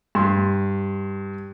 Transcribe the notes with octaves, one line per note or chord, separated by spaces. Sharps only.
G2 C6